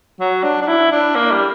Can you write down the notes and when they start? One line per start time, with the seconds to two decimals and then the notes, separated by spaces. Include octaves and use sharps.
0.20 F#3
0.44 D4
0.62 D4
0.68 E4
0.92 D4
1.16 A#3
1.32 G3